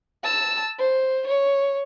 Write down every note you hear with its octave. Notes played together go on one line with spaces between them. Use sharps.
A5 E6
C5
C#5